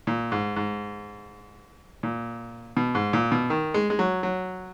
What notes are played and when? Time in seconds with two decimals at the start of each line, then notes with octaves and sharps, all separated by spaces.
0.07 A#2
0.32 G#2
0.56 G#2
2.03 A#2
2.77 B2
2.95 G#2
3.13 A#2
3.32 B2
3.50 D#3
3.74 G#3
3.90 G#3
3.99 F#3
4.23 F#3